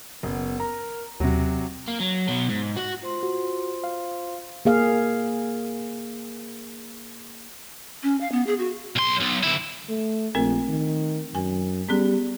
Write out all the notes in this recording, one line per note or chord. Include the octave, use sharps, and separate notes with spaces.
F#1 B3
A#4 A#5
D#2 C3 F#3 F#4
A#3
F#3
B2 F#3
G#2
F#4 F#5
F4 C5 C6
F#4
F5
A#3 G#4 F5
C#4
F5
B3
G#4
F#4
B1 C6
B1
D2 E4
A3
A#1 A3 C4 A#4
D#3
F#2 G#5
G3 B3 C#4 G#4